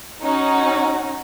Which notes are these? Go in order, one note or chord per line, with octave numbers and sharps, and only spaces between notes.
C#4 D#4 F#4